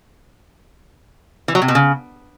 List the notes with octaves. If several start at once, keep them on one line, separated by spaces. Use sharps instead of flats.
E3
F#3
C3
B2
C#3